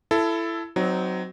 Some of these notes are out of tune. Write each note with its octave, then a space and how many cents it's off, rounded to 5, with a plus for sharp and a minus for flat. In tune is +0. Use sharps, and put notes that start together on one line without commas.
E4 +20 A4 +0
F#3 +5 C4 -20 D#4 +0